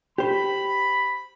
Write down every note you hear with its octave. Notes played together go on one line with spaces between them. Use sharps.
G4 C5 B5